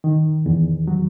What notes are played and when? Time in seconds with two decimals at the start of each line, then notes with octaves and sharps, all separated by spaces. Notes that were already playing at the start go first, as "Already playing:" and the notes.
0.04 D#3
0.46 E2
0.87 F#3